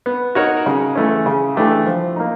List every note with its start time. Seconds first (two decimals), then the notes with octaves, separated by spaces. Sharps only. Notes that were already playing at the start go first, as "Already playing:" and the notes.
0.06 B3
0.35 D#4 F#4 A#4 C#5
0.66 C#3
0.95 E3 A3 C#4
1.26 C#3
1.56 E3 A3 D4 G4
1.86 F3
2.16 A#3 D#4